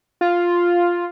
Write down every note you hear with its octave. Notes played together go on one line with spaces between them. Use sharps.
F4